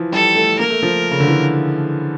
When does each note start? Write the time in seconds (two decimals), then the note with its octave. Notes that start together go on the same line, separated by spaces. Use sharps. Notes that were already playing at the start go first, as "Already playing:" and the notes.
Already playing: E3 F3
0.12 G3 A4
0.35 A3
0.59 A#3 A#4
0.70 A3
0.83 F3
1.11 C#3
1.20 D3
1.28 E3